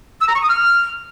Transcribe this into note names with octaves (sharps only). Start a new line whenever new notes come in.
E6
A#5
C#6
D#6
F6